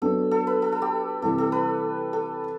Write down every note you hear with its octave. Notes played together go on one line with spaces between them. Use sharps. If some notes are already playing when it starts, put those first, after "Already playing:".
F#3 B3 D4 A4
A4
B4
A4
A4
G4
C3 E3 G3 A4
A4
B4
A4